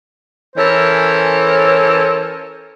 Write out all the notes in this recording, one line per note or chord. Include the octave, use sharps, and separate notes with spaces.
E3 C#4 A4 A#4 C5 C#5